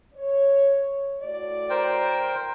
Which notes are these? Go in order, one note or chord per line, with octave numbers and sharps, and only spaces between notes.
C#5
A2 F#4 D5
A#4 C5 G5